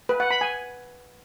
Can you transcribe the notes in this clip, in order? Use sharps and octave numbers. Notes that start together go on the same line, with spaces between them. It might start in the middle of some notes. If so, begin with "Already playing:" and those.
B4
F#5
B5
G#5